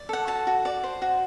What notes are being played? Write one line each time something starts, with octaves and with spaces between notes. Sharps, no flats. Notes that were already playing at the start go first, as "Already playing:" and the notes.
Already playing: D5
A4 F#5
F#4 A5
F#4
D5
C5
F#4